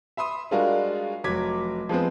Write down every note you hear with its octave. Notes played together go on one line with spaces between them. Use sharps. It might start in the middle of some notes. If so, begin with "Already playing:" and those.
E5 B5 C6 D#6
G3 G#3 D4 F4 F#4 A#4
F1 F#3 D6 G#6 B6
F3 G#3 B3 C4